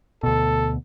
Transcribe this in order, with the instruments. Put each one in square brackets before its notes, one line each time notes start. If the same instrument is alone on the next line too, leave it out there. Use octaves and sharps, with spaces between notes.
[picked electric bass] D2 B2 [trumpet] A4